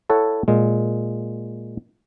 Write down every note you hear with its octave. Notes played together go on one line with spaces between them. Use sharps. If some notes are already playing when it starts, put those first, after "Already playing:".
E4 A4 C#5 F#5
A#2 G#3